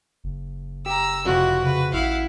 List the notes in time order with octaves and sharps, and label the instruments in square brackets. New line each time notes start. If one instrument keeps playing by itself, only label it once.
[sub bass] F#1
[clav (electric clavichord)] G4 [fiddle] A#5 E6
[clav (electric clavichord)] F2 C3 [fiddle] E4 [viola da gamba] F#4
[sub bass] C#3 [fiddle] B4
[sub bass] A1 [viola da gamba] E4 [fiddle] F5 F#5